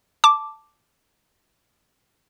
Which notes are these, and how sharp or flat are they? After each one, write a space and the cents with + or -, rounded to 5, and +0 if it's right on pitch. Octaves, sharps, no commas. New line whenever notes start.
A5 +0 D6 +0